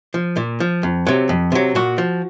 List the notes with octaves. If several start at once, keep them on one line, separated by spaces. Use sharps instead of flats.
F3
A#2
F3
F2
C3 F#3
F2
C3 F#3
A#2 F#4
F3